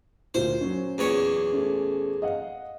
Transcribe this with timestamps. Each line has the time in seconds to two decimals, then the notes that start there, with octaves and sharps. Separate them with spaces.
0.34 D2 A#2 C5
0.61 F#3 C#4
0.98 E2 A#2 C#5
1.53 A3 C#4
2.22 D#5 F5 F#5